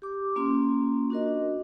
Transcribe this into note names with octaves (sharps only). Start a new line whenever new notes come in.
G4 D6
A#3 C#4 F4 C6
D4 F#4 A#4 D#5